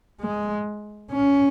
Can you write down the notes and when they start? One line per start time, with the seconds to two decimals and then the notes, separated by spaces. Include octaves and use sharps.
0.21 G#3
1.12 C#4